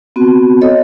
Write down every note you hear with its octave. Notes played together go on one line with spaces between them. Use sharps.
B3 C4 F#4
A4 C#5 D#5